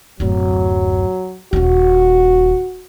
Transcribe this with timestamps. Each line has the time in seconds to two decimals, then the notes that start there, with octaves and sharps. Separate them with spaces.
0.20 D1 F#2 F#3
1.53 D#1 C#4 F#4